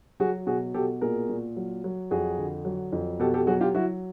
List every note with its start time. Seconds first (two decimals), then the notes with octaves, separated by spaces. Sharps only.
0.20 F#3 F#4 G#4
0.47 B2 F#4 G#4
0.74 B2 G4 A4
1.01 A#2 G#4 A#4
1.29 A#2
1.56 F#3
1.84 F#3
2.11 F2 F#4 G#4
2.38 D3
2.65 F#3
2.93 F2
3.20 B2 G4 A4
3.34 G4 A4
3.47 F#3 F#4 G#4
3.61 F4 G4
3.75 F#3 E4 F#4